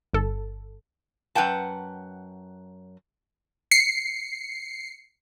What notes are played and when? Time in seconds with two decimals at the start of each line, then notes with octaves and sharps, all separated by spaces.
0.13 G1 A4
1.35 F#2 B4 F#5 G5 A5
3.71 C7 C#7